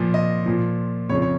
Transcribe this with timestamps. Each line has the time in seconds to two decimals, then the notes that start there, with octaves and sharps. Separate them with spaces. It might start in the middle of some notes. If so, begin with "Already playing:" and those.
Already playing: A#2 F3
0.14 D#5
0.46 A#2 F3
1.09 F2 C#5
1.12 C#3 F3
1.22 C#5